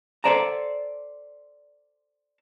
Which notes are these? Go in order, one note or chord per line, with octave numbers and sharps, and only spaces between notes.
A4 B4 C5 D5 A5 A#5